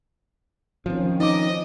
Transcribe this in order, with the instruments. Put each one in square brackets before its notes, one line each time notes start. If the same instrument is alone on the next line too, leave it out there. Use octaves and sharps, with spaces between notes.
[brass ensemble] D#3 C#4 [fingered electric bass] F3 C4
[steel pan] D#4 D6 [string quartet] D#5